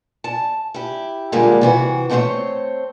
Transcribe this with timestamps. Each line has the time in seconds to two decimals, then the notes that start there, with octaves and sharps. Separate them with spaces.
0.24 A5
0.74 E4 G4
1.32 A#2 D3 G3 G#3 A#3
1.61 C3 E3 F#4
2.10 A3 C4 D4 A#4 C5 C#5